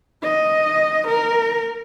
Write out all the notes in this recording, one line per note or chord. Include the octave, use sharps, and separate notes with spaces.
D#5
A#4